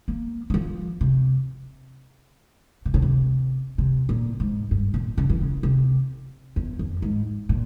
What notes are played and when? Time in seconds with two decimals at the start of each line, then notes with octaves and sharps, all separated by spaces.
0.08 A#3
0.50 E3
0.54 F3
1.01 C3
2.85 C3
2.94 C#3
3.02 C3
3.78 C3
4.09 A#2
4.40 G#2
4.71 G2
4.94 A#2
5.18 C#3
5.30 E3
5.40 C#3
5.63 C3
6.56 E2
6.79 F2
7.02 G#2
7.49 A#2